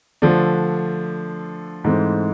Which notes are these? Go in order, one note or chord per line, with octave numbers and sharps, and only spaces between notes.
D3 F3 A3 D4
G#2 E3 A3 C4